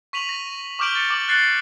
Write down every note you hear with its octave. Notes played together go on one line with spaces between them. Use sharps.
C#6 B6 D#7 F7 F#7
A#6
C#6 D6 F6 G6 D7 F#7
C#6 A6 C#7
D6 F#7
F#6 A6 C7 C#7 F#7